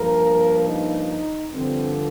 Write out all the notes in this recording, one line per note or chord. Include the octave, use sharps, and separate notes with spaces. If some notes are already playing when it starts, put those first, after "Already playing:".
Already playing: G2 F3 A#3 A#4
D#4
G2 D3 F3 C4